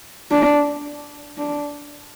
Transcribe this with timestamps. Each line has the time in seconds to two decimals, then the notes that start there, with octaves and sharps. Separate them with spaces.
0.31 D4
1.38 D4